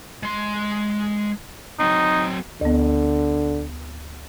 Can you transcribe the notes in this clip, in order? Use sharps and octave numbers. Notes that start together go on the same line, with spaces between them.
G#3 C6
F#3 C4 D#4
D2 D3 B3